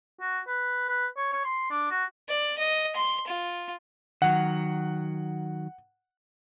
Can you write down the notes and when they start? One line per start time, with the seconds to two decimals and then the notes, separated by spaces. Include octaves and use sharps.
0.21 F#4
0.47 B4
0.89 B4
1.17 C#5
1.33 C#5
1.44 C6
1.70 D4
1.90 F#4
2.29 D5
2.58 D#5
2.96 C6
3.27 F4
4.22 D#3 F#3 F#5